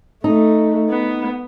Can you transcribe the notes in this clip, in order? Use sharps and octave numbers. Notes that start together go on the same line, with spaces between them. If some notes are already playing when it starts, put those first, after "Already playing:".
A3 D#4
B3